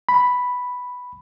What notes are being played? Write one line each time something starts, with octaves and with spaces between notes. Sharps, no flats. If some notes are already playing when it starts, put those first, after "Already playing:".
B5